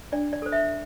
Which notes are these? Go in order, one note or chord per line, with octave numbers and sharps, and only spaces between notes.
D4 D5
D5
A4 C5
E5